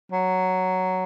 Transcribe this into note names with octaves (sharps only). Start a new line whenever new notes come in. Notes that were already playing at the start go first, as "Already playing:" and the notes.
F#3